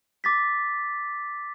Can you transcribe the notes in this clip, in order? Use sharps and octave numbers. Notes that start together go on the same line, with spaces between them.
D6 A6 B6